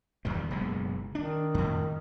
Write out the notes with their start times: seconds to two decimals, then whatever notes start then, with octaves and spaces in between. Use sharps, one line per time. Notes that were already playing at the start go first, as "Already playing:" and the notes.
0.25 E2 D#3 G3
0.51 F#1 B2 G#3
1.15 D#3 D4
1.54 F2 A2